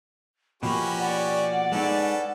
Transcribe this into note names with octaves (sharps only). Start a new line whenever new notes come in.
B2 F3 A#3 C#4 F#4 G4 B5
D5 F#5
G#3 C#4 D#4 A4 B4